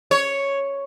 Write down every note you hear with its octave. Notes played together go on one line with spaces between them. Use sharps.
C#5